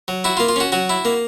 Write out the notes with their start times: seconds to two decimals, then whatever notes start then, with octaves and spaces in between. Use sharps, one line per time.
0.08 F#3
0.24 E4 F#4
0.37 F4
0.40 A#3
0.49 F4
0.56 C#4 F#4
0.72 F#3 F#4
0.89 E4
1.05 A#3